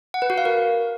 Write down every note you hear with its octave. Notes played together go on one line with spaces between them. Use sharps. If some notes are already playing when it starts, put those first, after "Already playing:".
F#5
B4
F#4
F5
A#4